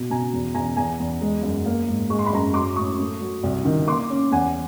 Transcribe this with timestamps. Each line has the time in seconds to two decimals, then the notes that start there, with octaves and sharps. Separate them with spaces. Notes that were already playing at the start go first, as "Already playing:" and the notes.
Already playing: B2
0.10 B2 G#5 A#5
0.33 E2
0.54 E2 G#5 A#5
0.76 E2 G#5 A#5
1.00 E2
1.21 G#3
1.43 F#2
1.66 A#3
1.88 G#2
2.10 G#3 C#6
2.19 C6
2.26 B5
2.33 F#2 A#5 C6
2.54 F#3 C6 D6
2.76 A2 C#6 D#6
2.99 A3
3.20 F#3
3.43 C2
3.65 D#3
3.87 A#3 C6 D6
4.10 C#4
4.31 E2 F#5 G#5